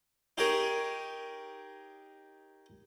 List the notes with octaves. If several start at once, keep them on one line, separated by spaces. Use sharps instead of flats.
D#4 G4 G#4 A#4 C#5